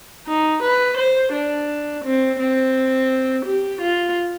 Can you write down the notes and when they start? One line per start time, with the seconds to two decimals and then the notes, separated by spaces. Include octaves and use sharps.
0.27 D#4
0.63 B4
0.97 C5
1.33 D4
2.04 C4
2.40 C4
3.45 G4
3.81 F4